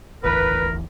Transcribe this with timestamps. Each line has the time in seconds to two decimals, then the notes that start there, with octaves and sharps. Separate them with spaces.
0.24 D1 A1 E2 A#4 B4